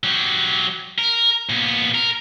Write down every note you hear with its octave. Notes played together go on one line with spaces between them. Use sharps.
F#3 G4
A#4
A#2 B3
A#4